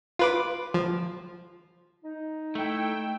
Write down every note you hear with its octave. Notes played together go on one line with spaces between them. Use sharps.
F4 B4 D6
F3
D#4
A3 E4 G5 E6